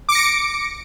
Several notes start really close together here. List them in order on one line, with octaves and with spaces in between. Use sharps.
D6 C#7 A#6 D7